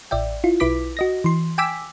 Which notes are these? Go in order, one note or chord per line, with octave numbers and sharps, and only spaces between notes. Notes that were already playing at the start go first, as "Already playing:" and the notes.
A1 D5 E5 G5
E4 F4
B1 E4 B4 D6 B6
F#4 D#5 A#6
E3 C6
G5 G#5 D6 E6 B6